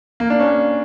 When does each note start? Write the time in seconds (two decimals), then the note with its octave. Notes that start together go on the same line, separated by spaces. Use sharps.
0.20 A#3
0.30 D4
0.40 C#4